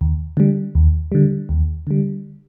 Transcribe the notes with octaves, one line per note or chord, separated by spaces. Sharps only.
D#2
D3 G3
D#2
D3 G3
D#2
D3 G3